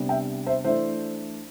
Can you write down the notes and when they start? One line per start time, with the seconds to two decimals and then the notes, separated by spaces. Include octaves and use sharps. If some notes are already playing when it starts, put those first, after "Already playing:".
Already playing: C3 G3 B3 D4
0.09 E5 G5
0.47 C5 E5
0.64 E3 A3 D4 C5 E5